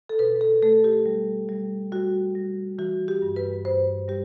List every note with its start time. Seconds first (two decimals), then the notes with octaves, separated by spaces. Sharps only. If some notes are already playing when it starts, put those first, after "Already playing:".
0.09 A4
0.19 B2 B4
0.41 A4
0.62 A3 A4
0.84 G4
1.06 G3
1.49 G3
1.92 G3 F#4
2.35 G3
2.78 E3 F#4
3.08 G4
3.22 G2
3.36 B4
3.65 G2 C5
4.08 G3 G4